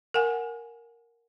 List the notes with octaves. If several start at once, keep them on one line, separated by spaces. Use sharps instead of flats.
A#4 F5 F#5 G#5